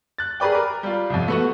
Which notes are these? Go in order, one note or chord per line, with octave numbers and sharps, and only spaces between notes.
F#6 A6
G#4 A#4 B4 D5 G5
A#4
G3 F4
C2 F2
A3 B3 F#4